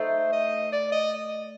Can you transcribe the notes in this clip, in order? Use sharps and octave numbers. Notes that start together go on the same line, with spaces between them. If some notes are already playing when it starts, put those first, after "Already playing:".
Already playing: A3 D#4 A4 C5
D#5
D5
D#5